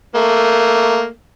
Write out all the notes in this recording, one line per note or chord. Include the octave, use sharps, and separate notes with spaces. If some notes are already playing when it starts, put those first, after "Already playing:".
A3 A#3